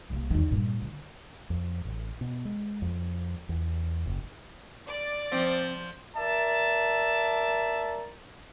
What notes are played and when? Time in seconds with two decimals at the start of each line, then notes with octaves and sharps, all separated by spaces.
0.10 C2 A#3
0.30 E2 D#3
0.49 G2 A#2
0.81 D3
1.50 F2
1.85 A1
2.21 B2
2.45 G#3
2.82 F2
3.49 E2
4.06 F#1
4.87 D5
5.32 F3 C4
6.17 A#4 D5 E5 A5